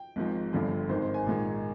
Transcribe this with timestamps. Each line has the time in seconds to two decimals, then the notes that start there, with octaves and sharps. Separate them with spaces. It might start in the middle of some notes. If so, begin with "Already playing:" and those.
Already playing: G5
0.16 G#1 G#2 F3
0.53 G1 G2 D3 F3
0.89 G#1 G#2 D#3 C5
1.02 C5
1.14 G#5
1.26 A#1 G#2 D#3